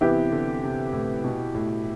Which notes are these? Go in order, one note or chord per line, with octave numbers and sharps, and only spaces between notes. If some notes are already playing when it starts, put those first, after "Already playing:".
C3 E3 B3 E4 G4
D3
C3
A2
B2
A2